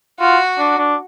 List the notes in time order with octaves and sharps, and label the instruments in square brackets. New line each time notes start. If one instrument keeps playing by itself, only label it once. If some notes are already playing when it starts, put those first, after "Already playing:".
[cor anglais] F4 [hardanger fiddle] F#4
[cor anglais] D4
D4